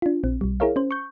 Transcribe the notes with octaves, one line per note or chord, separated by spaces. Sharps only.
D4 F4
A#1 C4
B1 G3
E4 G#4 A#4 C#5 F5
C#4 C5
C#6 G6